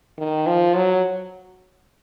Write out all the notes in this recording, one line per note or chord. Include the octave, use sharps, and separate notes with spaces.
D#3
F3
F#3